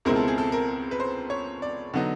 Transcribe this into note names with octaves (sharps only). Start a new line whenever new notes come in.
C#2 B2 G#3 C4 E4 A#4
A4
G#4
A4
A#4
B4
C5
C#5
D5
D3 F#3 B3 D#4